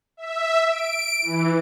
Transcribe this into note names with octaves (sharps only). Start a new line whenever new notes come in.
E5
D7
E3